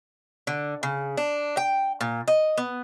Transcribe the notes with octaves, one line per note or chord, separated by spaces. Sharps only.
D3
C#3
D4
G5
A#2
D#5
B3